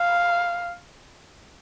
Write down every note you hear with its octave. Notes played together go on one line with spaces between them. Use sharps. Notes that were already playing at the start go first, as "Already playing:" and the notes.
Already playing: F5